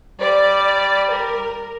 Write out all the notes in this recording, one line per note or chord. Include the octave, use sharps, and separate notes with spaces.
G3 D5
A#4